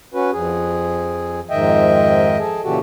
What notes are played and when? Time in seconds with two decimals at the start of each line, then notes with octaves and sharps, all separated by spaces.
0.14 C#4 F#4 B4
0.33 F2 G#4
1.50 F2 G#2 D#3 D#5 E5 G5
2.39 G#4 A4
2.64 A#2 C#3 E3 F#4 G4 A4